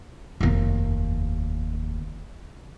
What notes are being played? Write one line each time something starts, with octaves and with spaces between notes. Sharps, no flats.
F1 D#2